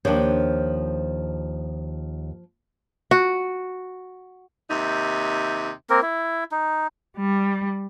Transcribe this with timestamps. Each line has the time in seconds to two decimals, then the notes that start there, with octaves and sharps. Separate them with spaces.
0.05 D#2 F3 D4 C#5
3.11 F#4
4.69 D#2 C3 D#4 E5
5.90 A#3 C4 A#4
6.02 E4
6.52 D#4
7.17 G3